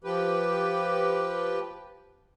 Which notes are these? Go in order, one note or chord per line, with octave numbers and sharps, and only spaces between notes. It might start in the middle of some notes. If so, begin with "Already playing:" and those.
F3 G4 B4